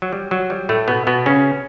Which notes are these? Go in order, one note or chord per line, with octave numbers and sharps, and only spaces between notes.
F#3
G3
F#3
G3
A2 A3
B2 B3
B2 B3
C#3 C#4